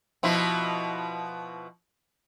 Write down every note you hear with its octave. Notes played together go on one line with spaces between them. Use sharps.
B2 F3 E4